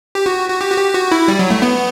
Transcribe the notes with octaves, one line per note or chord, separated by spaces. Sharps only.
G4
F#4
F#4
G4
F#4
G4
F#4
E4
G3
F#3
A3
B3